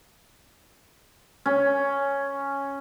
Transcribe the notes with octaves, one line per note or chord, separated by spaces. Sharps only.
C#4